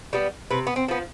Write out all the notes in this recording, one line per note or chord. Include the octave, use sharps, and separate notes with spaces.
G3 B3
C3 B4
B3
C4
F3 B3